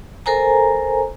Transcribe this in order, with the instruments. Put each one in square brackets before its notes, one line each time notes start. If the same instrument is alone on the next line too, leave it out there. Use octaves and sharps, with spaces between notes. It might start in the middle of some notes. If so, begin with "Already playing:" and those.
[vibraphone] A4 A#4 C5 G#5 A#5